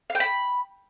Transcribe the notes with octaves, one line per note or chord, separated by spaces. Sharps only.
F5
G5
B5